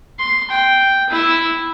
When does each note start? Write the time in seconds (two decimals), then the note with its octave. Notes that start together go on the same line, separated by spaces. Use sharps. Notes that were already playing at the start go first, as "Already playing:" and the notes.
0.19 C6
0.50 G5
1.09 E4